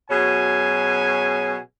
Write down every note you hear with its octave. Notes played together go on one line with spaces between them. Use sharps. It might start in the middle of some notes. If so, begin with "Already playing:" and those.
B2 F#3 C#4 G#4 G#5